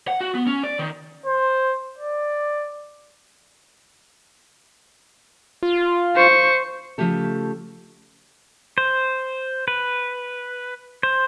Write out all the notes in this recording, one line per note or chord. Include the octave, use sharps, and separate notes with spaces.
F#5
F#4
B3
C#4
D5
D#3
C5
D5
F4
C5 C#6
C#3 E3 F3 A3 G4 A4
C5
B4
C5